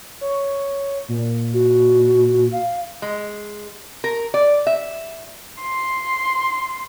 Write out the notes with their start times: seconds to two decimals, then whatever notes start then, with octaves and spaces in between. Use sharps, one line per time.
0.21 C#5
1.09 A#2
1.54 F#4
2.52 F5
3.02 G#3
4.04 A#4
4.34 D5
4.67 E5
5.62 C6